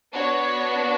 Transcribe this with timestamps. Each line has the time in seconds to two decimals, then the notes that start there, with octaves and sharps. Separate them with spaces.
0.13 B3 D4 F#4 C#5